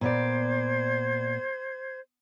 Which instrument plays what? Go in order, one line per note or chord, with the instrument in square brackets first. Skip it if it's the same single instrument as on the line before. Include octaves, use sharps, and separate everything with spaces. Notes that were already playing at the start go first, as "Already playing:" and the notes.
[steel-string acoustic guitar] A#2 B3 D5 [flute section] C5 G#6